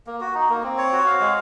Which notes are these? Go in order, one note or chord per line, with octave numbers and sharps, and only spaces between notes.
A#3
F#4
D#4
A#3
C4
C#5
F#4
F5
G#3